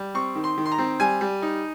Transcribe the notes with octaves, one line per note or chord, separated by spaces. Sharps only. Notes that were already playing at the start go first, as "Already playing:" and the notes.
Already playing: G3
C4 C#6
D#3
C6
D#3
C6
A#5
C4
G3 G#5
G3
D#4